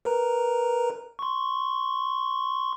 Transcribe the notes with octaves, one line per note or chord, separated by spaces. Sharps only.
A#4 B4 A#5
C6 C#6